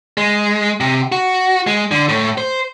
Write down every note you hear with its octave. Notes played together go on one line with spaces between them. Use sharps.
G#3
C3
F#4
G#3
D3
A2
C5